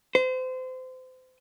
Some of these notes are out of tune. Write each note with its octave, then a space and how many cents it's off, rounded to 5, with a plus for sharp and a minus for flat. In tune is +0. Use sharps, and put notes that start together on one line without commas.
C5 -30